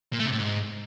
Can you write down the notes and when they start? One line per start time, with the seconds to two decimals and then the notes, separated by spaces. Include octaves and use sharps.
0.13 A#2
0.19 A3
0.26 C3
0.32 A2
0.38 G#2